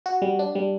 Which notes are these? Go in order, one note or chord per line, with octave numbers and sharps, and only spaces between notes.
F#4
G3
D4
G3